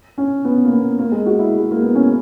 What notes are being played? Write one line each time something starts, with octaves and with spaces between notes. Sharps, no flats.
C#4
B3
A#3
B3
A#3
G#3
F#4
E4
G#3
A#3
B3
C#4